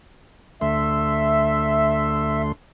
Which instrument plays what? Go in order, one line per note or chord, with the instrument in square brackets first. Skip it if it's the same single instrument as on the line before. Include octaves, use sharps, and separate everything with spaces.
[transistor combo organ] D2 A3 C6 [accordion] E5